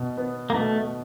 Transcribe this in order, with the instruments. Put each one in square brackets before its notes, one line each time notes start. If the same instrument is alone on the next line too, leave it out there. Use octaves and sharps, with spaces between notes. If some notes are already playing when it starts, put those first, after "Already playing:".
Already playing: [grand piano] B2
B3
[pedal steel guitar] A#3
[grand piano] B2 [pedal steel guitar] A3